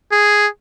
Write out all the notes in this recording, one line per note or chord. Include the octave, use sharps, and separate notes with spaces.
G#4